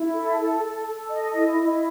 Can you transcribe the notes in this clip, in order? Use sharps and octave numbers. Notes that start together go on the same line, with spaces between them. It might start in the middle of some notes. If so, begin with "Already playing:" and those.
Already playing: E4
A4
A4
A4
A4
D#5
E4
E4